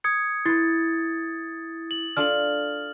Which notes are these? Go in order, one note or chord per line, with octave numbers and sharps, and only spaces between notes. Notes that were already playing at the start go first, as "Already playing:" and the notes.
D#6 G#6 C#7
E4 B4 C6 A6
F#7
D4 F4 A4 F6 F#7